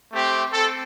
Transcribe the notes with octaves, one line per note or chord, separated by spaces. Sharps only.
A3 C4 G4
C4 A4